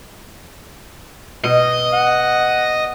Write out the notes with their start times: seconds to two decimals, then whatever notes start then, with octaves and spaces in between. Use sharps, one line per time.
1.44 B2 D#5
1.93 F#5